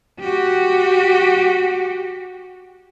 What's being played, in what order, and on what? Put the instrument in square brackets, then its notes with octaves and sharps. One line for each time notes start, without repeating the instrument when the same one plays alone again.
[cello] F#4 G4